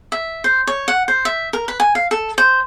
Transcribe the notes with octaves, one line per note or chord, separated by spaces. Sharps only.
E5
C5
C#5
F#5
C5
E5
A#4
B4
G#5
F5
A4
C5